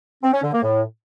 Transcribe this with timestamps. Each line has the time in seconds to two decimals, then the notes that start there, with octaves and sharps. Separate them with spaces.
0.23 C4
0.33 C#4
0.43 D3
0.52 A#3
0.62 A2